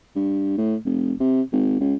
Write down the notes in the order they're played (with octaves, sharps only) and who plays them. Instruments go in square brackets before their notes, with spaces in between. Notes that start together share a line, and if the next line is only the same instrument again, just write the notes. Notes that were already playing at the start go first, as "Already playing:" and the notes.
[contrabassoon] G2
A2
F1
C3
G#1
C#2